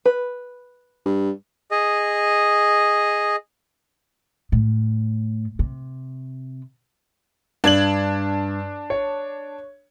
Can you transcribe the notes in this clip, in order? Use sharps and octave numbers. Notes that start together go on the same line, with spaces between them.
B4
G2
G#4 D#5
A2
C3
G2 D4 G#6 F#7
C#5